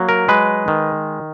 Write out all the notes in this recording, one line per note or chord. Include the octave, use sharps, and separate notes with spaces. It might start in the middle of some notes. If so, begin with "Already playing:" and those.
Already playing: F#3 A#3
A#4
G#3 B4
D#3